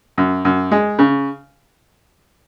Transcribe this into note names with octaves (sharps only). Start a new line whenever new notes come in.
F#2
F#2
G#3
C#3